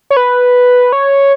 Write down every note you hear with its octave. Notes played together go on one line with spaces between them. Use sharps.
C#5
B4
C#5